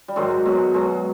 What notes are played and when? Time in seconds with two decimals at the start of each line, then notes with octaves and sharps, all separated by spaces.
0.08 G3
0.16 G#2 D#3 F#3 G#3
0.31 G#3
0.45 B2 F#3 G#3
0.74 B2 F#3 G#3